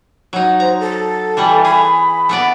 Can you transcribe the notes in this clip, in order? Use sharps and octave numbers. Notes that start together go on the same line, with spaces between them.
F#3 D#4
C5 A#5
A4
E3 G3 A3
G#4 B5
A3 B3 D5